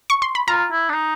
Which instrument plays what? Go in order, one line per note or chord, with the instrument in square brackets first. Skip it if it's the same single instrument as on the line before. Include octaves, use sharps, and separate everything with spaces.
[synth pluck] C#6
C6
B5
[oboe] F4 [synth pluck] A#5
[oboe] E4
D4
D#4